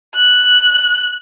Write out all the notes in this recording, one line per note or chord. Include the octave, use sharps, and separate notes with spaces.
F#6